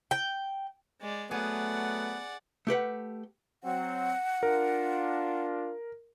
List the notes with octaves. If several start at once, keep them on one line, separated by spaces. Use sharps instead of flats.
G5
G#3 D5
F#3 A3 B3 G#4 D5 F#5
A3 G4 B4 F#5
F#3 C4 F#5
D4 F4 A#4